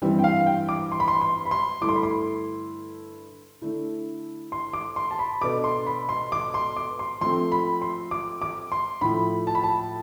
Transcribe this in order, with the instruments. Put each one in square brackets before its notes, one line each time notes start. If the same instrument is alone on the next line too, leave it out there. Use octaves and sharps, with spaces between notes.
[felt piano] G2 E3 G3 C4
[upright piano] G5
F5
G5
D6
C6
B5
C6
C6
B5
C6
[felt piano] G2 D3 A3 E4 A4 [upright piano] D6
[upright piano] C6
B5
C6
[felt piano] D3 A3 E4
[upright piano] C6
D6
C6
A5
B5
[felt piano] B2 B3 D4 A4 [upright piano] D6
[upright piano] C6
B5
C6
D6
C6
D6
C6
[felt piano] F3 A3 C4 [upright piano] C6
[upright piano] B5
C6
D6
D6
C6
[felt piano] A2 F3 A3 [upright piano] B5
[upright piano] A5
B5
A5